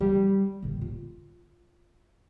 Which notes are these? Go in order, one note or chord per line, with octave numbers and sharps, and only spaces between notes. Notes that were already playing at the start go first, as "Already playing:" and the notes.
G3
A1 D3
F4